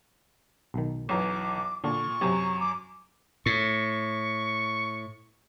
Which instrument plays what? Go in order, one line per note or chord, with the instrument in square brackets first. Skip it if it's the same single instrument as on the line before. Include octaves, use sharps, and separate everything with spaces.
[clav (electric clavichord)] B1 D#3
[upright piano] B1 F#2 E3 [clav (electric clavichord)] C#5 A#5 [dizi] D6
[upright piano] A#2 [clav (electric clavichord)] D3 D4 [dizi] C#6
[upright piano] F#2 F#3 [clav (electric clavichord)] C3 G4
[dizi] D6
[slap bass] A2 [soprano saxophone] C#6